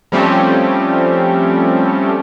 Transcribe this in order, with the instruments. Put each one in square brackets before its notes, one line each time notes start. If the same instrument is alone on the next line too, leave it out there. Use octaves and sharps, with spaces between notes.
[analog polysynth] F3 G3 A3 C4 C#4 G4